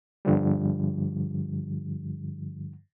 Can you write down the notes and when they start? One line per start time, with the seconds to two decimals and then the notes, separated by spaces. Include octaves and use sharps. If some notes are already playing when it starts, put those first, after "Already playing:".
0.25 G2 D3 F3 G3